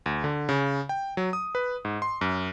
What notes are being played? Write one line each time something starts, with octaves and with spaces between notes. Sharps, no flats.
D2
D3
C#3
G5
F#3
D#6
B4
G#2
C6
F#2